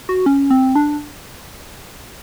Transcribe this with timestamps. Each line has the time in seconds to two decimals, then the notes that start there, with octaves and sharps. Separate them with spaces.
0.09 F#4
0.26 C#4
0.51 C4
0.76 D4